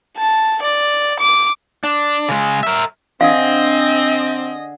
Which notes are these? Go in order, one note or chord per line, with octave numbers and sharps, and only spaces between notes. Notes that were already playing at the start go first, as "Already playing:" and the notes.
A5
D5
D6
D4
C#3 G#3
A#4 E5
D3 C4 G#4 D#5 F5